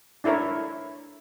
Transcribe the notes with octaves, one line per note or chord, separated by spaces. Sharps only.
D4 E4 A4 A#4 C#5